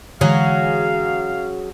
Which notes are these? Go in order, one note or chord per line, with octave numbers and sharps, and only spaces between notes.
D3 E3 F#3 G#3 C#4 G#4 F5